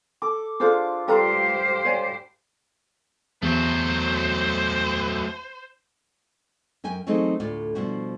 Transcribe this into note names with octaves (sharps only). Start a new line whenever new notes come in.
A4 D6
D4 F4 G#4 A4 C5 D6
G3 F4 G4 A4 B4 C5 A#5 C6
C#5 D5 G#5
E2 F#3 A3 C5
F#2 A#4 G5 G#5
E3 F#3 A3 C4 D#4 G#4
D2 A2 F4 D5
G2 B2 F3 E4 F#4